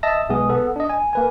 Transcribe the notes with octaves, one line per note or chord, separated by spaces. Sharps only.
D#5 E5 A5 A#6
B1 G#3 B3 G#4 D#6
B3 A4
D4 D#5
G#5
A#3 B4 G#5